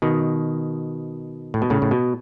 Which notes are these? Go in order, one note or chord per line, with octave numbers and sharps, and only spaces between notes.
B2 D#3
A2
B2
A2 C#3
A2
B2